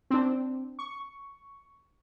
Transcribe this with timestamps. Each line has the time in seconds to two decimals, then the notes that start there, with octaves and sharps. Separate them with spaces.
0.10 C4 D4
0.79 C#6